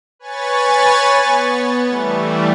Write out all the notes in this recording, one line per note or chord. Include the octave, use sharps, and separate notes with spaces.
B4 C#5 G#5 C#6 A6
B3
E3 G3 A3